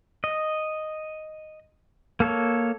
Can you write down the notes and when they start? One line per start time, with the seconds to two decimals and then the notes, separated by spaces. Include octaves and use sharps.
0.24 D#5
2.20 A#3 A4 C#5